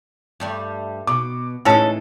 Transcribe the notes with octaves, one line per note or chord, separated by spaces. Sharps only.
G2 G3 A3
B2 D6
A2 E3 G#3 C#4 D#4 A4